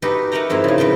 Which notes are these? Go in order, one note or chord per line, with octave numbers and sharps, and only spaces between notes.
D#4 F#4 G4 A4 B4
A#4 B4 E5 F#5 G5 A#5
F2 G#2 C4 E4
A2 C#3
F2 B4 G5 A5